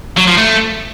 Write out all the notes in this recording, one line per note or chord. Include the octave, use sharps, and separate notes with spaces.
F#3
F3
A3